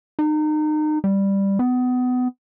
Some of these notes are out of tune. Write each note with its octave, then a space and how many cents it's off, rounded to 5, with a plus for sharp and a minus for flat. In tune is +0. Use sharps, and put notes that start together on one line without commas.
D#4 -30
G3 +5
B3 +25